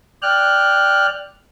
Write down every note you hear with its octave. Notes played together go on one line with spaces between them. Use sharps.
D5 G5 F6 F#6